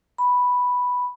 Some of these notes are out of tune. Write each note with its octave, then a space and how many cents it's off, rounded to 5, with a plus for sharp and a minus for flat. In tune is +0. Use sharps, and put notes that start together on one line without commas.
B5 +0